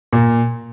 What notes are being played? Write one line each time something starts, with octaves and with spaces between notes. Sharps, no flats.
A#2